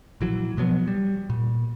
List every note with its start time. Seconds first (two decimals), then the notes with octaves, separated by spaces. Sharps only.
0.21 A#1 E3 F#3
0.57 B2 F3 F#3 B3
0.87 G3
1.30 A#2